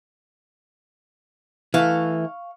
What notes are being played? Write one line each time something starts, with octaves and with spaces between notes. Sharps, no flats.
E3 A3 F5 C#6